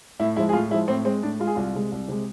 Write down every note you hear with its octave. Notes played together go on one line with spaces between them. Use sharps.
A2 E4
F3 G#3 E4
G#4
A2 F4
F3 G#3 E4
A2 C4
G#3 C4
A2 D4
G#3 F4
G#4
C2 F4
C3 G#3
C2
C3 G#3